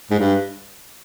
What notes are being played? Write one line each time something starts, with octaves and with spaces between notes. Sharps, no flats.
G#2
G2